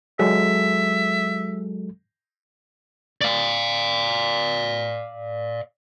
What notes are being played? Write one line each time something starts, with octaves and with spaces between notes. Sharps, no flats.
F#3 G#3 A4 E5
D5 F5